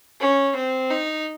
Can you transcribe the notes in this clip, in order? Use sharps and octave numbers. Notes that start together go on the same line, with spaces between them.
C#4
C4
D#4